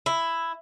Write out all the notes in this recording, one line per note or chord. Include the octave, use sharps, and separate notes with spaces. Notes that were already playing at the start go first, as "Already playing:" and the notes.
E4